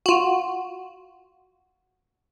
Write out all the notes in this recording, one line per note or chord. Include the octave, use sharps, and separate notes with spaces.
F4 F#4